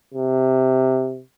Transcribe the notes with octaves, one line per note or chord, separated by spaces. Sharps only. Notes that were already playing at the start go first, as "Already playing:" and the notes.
C3